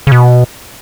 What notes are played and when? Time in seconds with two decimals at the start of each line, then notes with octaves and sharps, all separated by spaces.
0.07 C#3
0.12 B2